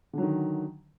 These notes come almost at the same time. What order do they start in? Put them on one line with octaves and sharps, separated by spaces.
D3 F#3 D#3